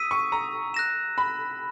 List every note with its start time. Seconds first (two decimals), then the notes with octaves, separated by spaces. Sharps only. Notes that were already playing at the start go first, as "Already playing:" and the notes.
Already playing: D#6 E6 B6 D#7
0.11 C#6
0.32 A#5
0.74 F#6 A#6 E7
1.18 B5